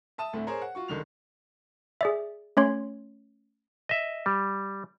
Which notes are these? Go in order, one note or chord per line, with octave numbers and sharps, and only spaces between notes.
E5 A5 D#6 E7
D2 A2 A3 C4
G#4 A#4 C5 C#5 A#5
F#5
F4 F#4 C#6
C#2 D3 D#3 F7
G#4 D5 E5
A3 C#4 C#5 C6
D#5 E5
G3